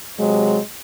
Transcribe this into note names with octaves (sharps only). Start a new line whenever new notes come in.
C3 F#3 G#3